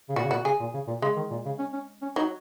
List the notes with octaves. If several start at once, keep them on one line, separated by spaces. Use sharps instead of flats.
C#3
A#2 F#4
C#3
A#2 F#4
C#3 G#4
A#2
C#3
A#2
C#3 G#3
D#3
A#2
C#3
C#4
C#4
C#4
F#3 D#4